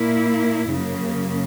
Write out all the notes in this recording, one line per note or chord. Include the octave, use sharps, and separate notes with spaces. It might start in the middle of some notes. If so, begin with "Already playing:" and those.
Already playing: A#2 A#3 E4
F#2 C#3 F#3 A#3